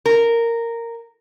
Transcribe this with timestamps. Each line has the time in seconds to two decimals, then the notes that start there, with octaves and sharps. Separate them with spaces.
0.06 A#4